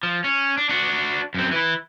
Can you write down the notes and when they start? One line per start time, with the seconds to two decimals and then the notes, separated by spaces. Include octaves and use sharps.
0.03 F3
0.24 C#4
0.58 D4
0.69 D4 F#4
1.34 F#2 C4
1.51 E3 E4